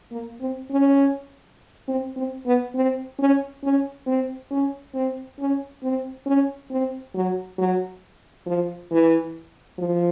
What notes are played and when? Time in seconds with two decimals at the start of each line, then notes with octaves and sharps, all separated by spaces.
0.12 A#3
0.41 C4
0.71 C#4
1.88 C4
2.16 C4
2.46 B3
2.75 C4
3.19 C#4
3.64 C#4
4.07 C4
4.51 C#4
4.95 C4
5.39 C#4
5.83 C4
6.27 C#4
6.71 C4
7.15 F#3
7.58 F#3
8.47 F3
8.91 E3
9.78 F3